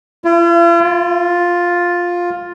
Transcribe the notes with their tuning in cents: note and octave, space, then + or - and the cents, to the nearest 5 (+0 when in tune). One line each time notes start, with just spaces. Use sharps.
F4 -45
F4 +5